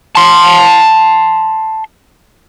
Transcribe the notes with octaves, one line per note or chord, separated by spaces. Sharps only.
A5 C6